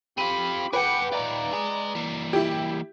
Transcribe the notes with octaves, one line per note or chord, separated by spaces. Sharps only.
C4 F4 G4 B5 D#7
G#4 B4 F#5 G5 D6 C#7
D#4 F4 D5 A#5
G#4 D#5
E3 A#3
E4 G4